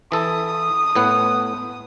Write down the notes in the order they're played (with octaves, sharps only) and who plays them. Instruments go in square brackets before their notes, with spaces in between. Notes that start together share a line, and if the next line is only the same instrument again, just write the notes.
[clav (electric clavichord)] E3 A4 [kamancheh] D#6
[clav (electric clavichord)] A2 B3 F#5